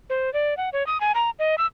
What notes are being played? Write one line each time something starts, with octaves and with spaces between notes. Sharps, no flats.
C5
D5
F#5
C#5
D#6
G#5
A#5
D#5
E6